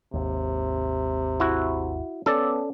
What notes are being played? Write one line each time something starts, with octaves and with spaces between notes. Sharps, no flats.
G#1 D#2 C3
E4 F#4
B3 C#4 A4 D5